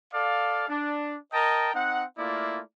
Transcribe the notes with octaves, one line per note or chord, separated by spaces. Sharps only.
A4 D5 F5
D4
A#4 D#5 G5 A5 A#5
C4 D#4 F#5
A3 A#3 E4 F4 D5